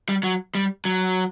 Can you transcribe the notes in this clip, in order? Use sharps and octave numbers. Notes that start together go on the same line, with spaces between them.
G3
F#3
G3
F#3